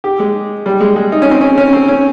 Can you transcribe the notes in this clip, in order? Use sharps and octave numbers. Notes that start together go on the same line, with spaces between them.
G4
G#3
G3
G#3
G#3
D#4
C#4
C4
C#4
C#4
C4
C#4